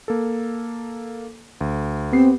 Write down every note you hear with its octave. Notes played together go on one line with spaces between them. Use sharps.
A#3 A4
D2
B3 C4 G4 C7